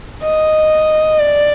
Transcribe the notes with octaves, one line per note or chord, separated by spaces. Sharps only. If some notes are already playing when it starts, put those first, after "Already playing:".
D#5
D5